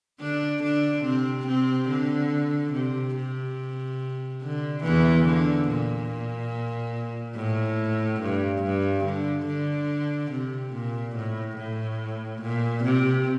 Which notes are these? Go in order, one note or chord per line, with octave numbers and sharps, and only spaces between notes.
D3 D4
D3 D4
C3 C4
C3 C4
D3
C3
C3
D3
E2 E3
D3
A#2
A2
G2
G2
D3
D3
C3
A#2
A2
A2
A#2
C3